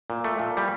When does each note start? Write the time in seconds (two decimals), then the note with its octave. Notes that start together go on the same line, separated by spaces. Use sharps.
0.10 A#2
0.24 A3
0.39 A#2
0.57 G3